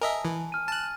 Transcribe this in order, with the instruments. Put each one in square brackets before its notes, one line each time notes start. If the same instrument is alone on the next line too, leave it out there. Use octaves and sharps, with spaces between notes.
[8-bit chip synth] A#4 D#5 E5 [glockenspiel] G#5 A5
[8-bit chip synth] E3
[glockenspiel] F6 D#7
[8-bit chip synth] A5 F#6